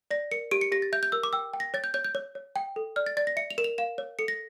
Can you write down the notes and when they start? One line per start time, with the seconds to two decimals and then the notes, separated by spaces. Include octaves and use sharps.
0.11 D5 A#6
0.31 A#4 C#7
0.51 G4 D7
0.61 C#7
0.72 G4 A#6
0.82 A6
0.93 E5 G6
1.03 G6
1.12 A#4 E6
1.23 D6
1.33 G5 E6
1.54 G5
1.60 A#6
1.74 C#5 A6
1.84 G6
1.94 C#5 G6
2.04 G6
2.15 C#5
2.35 C#5
2.56 G5
2.76 A4
2.96 D5 F6
3.06 A6
3.17 D5 A6
3.27 A#6
3.37 E5 C#7
3.50 F7
3.58 A#4 E7
3.64 F7
3.78 F5 E7
3.98 C#5
4.19 A4 C#7
4.28 A#6